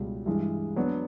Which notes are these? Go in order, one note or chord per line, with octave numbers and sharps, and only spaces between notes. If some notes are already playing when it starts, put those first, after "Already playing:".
Already playing: C#2 B2 G3
G2 E3 G#3
F#3 B3 D4 F#4